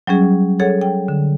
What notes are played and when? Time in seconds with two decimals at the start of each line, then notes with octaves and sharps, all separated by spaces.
0.07 F#3 G3 C#4 G#4
0.60 G#4 A4 C#5 F#5
0.81 G5
1.08 D3